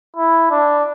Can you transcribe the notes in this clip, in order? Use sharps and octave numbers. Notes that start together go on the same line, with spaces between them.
E4
D4